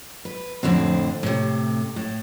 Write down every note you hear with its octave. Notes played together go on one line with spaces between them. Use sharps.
B4
F2 A2 D3 C4
A2 C3
A2